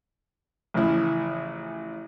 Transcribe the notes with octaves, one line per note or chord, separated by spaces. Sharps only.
A1 C#3 F3 E4